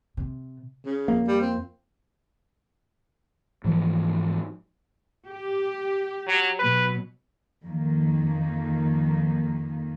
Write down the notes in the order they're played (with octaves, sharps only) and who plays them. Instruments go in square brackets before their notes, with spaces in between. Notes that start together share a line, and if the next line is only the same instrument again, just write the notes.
[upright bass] C3
[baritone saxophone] C#3
[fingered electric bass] F2 F3 A#3
[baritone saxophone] G3
C4
[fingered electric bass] G#2 E3 F3
[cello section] G4
[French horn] F#3
[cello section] B2 F#3 [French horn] B4
[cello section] F2 D#3 A#3